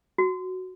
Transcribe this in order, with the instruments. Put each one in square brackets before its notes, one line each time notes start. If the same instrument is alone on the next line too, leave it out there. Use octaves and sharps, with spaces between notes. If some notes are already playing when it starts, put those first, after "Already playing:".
[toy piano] F#4